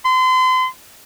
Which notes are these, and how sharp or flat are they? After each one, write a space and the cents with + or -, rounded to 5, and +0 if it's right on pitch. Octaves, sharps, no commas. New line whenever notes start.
C6 -35